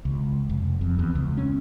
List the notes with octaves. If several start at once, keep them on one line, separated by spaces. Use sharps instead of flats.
C#2
F1
F2
E2
C#2
C#4